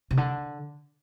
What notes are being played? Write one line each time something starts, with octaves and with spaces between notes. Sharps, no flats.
C3
D3